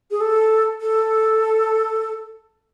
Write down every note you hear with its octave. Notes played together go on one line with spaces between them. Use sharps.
G#4
A4
A4